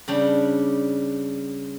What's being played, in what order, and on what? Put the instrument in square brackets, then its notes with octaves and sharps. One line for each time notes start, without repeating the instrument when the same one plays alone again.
[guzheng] C#3 G3 D4